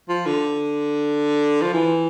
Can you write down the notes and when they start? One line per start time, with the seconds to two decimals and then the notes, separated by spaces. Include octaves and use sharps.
0.09 F3
0.26 D3
1.62 F3
1.73 E3